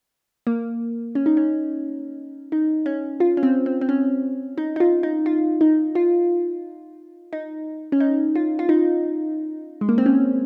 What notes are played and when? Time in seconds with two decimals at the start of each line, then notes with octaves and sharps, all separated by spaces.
0.47 A#3
1.15 C#4
1.26 D#4
1.37 C#4
2.52 D#4
2.86 C#4
3.20 F4
3.37 C#4
3.43 C4
3.66 C4
3.81 C4
3.89 C#4
4.58 D#4
4.76 D#4
4.80 F4
5.03 D#4
5.26 F4
5.61 D#4
5.95 F4
7.33 D#4
7.92 C#4
8.00 D#4
8.35 F4
8.59 F4
8.69 D#4
9.81 G#3
9.89 A#3
9.98 C4
10.06 C#4